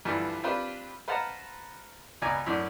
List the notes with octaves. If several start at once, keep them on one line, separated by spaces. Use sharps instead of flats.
G2 D3 E3 F3
C4 D4 F4 G4 B4 C5
B4 C5 F5 F#5 A5 A#5
C#2 B2 D5 G#5 A#5
F#2 A2 C#4 D4